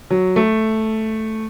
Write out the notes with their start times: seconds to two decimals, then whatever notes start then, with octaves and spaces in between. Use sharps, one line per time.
0.10 F#3
0.36 A3